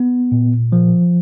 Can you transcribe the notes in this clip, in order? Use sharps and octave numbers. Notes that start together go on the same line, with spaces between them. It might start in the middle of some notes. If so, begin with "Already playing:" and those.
Already playing: B3
A#2
F3